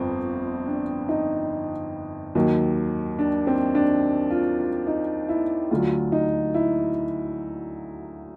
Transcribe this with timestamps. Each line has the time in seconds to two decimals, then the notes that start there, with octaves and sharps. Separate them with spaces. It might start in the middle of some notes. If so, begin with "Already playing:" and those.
Already playing: G1 F2 C4
0.68 D4
1.09 D#4
2.35 D#2 D#3 F#3
3.19 D4
3.47 C4
3.75 D4
4.31 F4
4.59 F4
4.87 D#4
5.29 E4
5.71 D2 D3 F#3 F4
6.12 D#4
6.54 E4